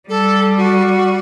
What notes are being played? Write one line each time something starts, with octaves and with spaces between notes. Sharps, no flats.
G3 A4
F#4